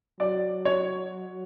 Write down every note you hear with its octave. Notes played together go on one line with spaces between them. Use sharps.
F#3 D5
C#5